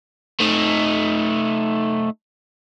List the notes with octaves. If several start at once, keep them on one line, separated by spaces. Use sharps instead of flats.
A3 D#4